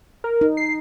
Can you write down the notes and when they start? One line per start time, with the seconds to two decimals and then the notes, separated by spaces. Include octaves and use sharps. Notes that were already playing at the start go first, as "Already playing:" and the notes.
0.24 A#4
0.41 D#4
0.57 C7